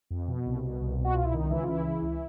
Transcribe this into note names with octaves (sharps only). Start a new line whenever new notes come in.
F2
B2
C2
B2
C2
B2
F#4
C2 F4
E4
C#2 D#3 D#4
C#2 E3 E4
F4
C#3 E3 E4
E3
C#2